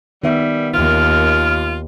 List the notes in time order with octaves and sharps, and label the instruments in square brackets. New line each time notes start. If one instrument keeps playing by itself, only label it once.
[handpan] D#3 B3 E5 [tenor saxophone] G3
[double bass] D#2 [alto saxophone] F4 [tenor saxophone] A#4